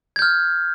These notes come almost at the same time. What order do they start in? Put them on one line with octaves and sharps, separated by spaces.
G#6 G6 F6